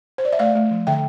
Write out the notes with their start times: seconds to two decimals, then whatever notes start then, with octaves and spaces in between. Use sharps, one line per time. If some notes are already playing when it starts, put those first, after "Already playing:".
0.18 C5
0.25 D5
0.33 E5
0.39 A3 D5 F5
0.55 A3
0.71 F3
0.87 D3 E5 G5